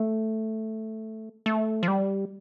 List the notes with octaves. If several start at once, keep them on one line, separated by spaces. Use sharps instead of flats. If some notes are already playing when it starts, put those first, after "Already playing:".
Already playing: A3
A3
F3
G3